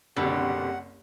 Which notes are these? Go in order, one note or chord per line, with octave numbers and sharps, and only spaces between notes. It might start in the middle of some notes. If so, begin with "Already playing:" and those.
F#1 C2 B2 D3 G4 F#5 G5 C6